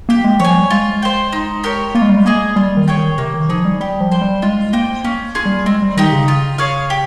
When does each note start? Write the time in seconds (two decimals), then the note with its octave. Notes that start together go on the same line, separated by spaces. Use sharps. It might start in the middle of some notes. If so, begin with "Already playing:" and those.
0.09 A#3 G4
0.24 G#3
0.40 F3 C#5 G#5
0.55 G3
0.70 G#3 F4
1.02 C5 G5
1.33 D#4
1.64 G4 A#4 C#5
1.95 A#3 F4
2.02 G#3
2.09 G3
2.16 G#3
2.25 A#3 G#4 D#5 G#5
2.56 G3 F4
2.77 D#3
2.88 G#4 C#5 G5
2.97 D#3
3.18 C3 A#3
3.34 D#3
3.49 F3 D#4 G#4
3.65 G3
3.81 G3 G4
4.00 F3
4.12 C5 G5
4.22 G3
4.42 G#3 F4
4.73 A#3 C5 D#5 G5
5.04 A#3 C#4
5.35 F4 G#4
5.46 G3
5.66 G#3 C4
5.82 G3
5.97 D#3 D#4 G4
6.12 C#3
6.28 F4
6.58 G#4 C#5 F5
6.90 G4